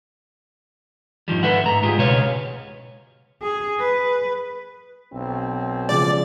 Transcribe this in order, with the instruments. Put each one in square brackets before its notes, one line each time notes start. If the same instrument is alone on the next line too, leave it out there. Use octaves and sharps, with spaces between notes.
[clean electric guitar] G#2 D#3 F3 G3
A4 B4 E5 F#5
G#2 A#5
G#3 F4 G4 G#4
C#2 B2 B4 C#5 F5
[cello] G#4
B4
[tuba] B1 [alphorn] C4
[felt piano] C#3 F3 G#3 [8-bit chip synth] D5